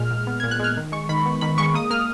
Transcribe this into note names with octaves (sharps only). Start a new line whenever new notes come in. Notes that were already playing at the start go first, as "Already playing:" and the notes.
Already playing: A#2 G#3 F6
A#2
B3
A#2 G#6
F#6
G#3 F6
D#3
G#3 C#6
D#3 B5
B3
D#3 B5
G#3 C#6
A#3 D#6
A#3 F6